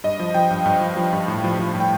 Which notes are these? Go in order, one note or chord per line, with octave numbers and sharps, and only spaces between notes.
G2 D#5
F3
F3 G5
G2
G2
F3
F3
G2
A2
F3
F3
A2
G5